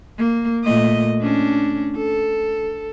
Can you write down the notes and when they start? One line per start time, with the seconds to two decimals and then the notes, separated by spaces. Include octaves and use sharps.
0.18 A#3
0.65 A#2 A3 D#5
1.22 C#4 D4
1.96 A4